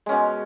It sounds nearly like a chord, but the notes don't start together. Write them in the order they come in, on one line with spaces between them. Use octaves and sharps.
G#3 C#4 B2